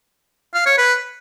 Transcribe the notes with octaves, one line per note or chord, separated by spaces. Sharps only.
F5
C#5
B4